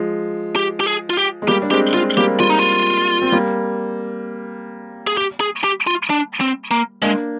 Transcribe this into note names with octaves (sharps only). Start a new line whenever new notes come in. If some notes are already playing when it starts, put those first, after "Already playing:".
Already playing: F3 G#3
G4
G4
G#4
F4
G4
G#3
G3 A#3 G4
D4
G#3 C4 G4
G#3 C4 F4
G3 A#3 G4
G3 F4
D#4
F4
C4
G3 A#3
G#4
G4
G#4
G4
F4
D4
C4
A#3
G#3 A#3 D4